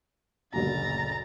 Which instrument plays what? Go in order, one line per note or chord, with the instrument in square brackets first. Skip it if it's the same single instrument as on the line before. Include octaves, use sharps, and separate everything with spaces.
[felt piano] F#1 D2 A#2 [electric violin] A#5 A6